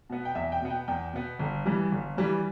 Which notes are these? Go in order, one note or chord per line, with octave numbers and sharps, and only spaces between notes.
B2 B3
G5
E2 E5
G5
B2 B3
G5
E2 G5
B2 B3
G1
G2 E3 G3
G1
G2 E3 G3